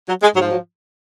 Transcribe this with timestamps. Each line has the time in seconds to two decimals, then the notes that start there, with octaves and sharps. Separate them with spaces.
0.08 F#3
0.22 G#3
0.36 G#2 F3 F#3
0.51 F#3